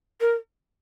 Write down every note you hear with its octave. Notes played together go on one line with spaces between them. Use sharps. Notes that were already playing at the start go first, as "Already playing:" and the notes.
A#4